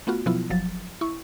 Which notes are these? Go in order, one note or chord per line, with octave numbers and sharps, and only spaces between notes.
A3 B3 F4 F#4
B2 F3 F#3 B3 E4 F4
G1 F3 F#3 A6
E4 C#6